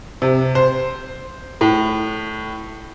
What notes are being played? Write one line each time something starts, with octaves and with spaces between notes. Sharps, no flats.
C3
C5
A2